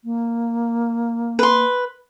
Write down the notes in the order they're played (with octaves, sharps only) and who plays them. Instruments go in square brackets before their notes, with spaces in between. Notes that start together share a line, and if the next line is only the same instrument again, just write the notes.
[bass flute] A#3
[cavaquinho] B4 C6